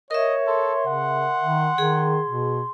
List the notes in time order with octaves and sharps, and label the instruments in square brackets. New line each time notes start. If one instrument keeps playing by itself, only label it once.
[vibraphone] A#4 E5 [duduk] C#5 [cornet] D#5
[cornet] A4 [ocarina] C6
[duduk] C#3 [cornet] F#5
[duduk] D#3
[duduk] D#3 [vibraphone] G#4
[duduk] B2